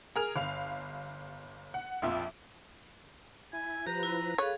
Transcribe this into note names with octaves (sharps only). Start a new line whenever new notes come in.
G#4 A#4 F6 F7
G1 F5 F7
F#5
A#1 F2 F4 E5
E4 G#5
F3 G4 B4 A#5
E4
G#4 A4 B4 C#5 F5